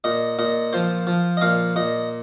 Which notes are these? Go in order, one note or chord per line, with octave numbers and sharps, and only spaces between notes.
A#2 D#5
A#2 D#5
F3 C5
F3
D#5
A#2 F5
A#2 D#5